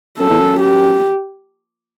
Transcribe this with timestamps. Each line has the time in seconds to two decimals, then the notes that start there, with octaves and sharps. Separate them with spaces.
0.19 F#2 A4
0.30 E2
0.40 F#2
0.60 G4